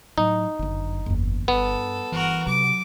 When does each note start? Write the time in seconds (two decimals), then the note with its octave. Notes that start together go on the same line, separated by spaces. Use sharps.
0.18 A2 F#3 D#4
0.59 G1 F#2 D3
1.06 F#1 E2
1.48 G2 B3 A4
2.12 G1 E3 F#4 A#4
2.47 C3 F#3 D6